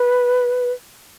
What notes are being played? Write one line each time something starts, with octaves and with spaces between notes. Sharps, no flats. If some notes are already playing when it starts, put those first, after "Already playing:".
Already playing: B4